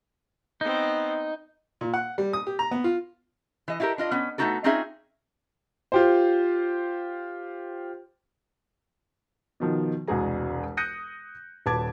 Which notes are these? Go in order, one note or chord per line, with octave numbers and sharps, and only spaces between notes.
B3 C4 D#4
A#2
F#5
G3
D#6
G4
A#5
B3
F4
E3 D#5
E4 F#4 G4 A4 A#4
D4 F4 D#5
B3 C#4
A3 B3 C4 D#4 F#4 A4
C4 C#4 D#4 F4 G#4 E5
F4 G4 C5
B2 D#3 F3
E1 C2 G#3 F#4 G#4 A#5
D#6 F#6 G6 A#6 C#7 D#7
D#1 B4 A5 D6 G#6